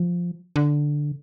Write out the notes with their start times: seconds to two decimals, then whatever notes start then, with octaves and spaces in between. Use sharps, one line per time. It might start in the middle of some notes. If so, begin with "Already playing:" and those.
Already playing: F3
0.56 D3